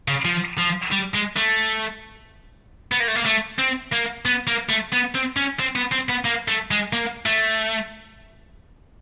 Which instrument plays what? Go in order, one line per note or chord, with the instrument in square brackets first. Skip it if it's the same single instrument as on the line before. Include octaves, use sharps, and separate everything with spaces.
[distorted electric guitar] C#3
F3
F3
G3
G#3
A3
B3
A#3
A3
A#3
A3
C4
A#3
B3
A#3
A3
B3
C4
C#4
C4
B3
C4
B3
A#3
A3
G#3
A#3
A3